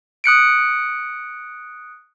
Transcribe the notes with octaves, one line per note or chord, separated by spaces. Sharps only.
D#6 F#6 C#7 D7